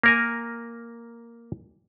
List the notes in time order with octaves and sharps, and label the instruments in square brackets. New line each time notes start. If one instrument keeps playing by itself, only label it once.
[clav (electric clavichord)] A#3 A#4 G#5